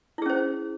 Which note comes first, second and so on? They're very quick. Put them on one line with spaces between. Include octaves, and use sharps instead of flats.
E4 G#4 C#4 C5